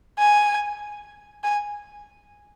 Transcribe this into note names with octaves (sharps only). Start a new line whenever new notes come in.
G#5
G#5